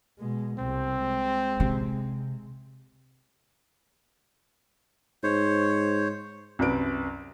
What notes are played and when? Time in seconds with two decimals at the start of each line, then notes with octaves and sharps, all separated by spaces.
0.19 B2 G#3
0.59 C2 C3 C4
1.04 G#3
1.60 C3
5.23 G#2 C5 C#5
6.59 C2 F#2 B4 D7